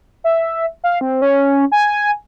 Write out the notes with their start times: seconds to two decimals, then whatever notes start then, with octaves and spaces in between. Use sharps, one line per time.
0.24 E5
0.84 F5
1.01 C4
1.22 C#4
1.72 G#5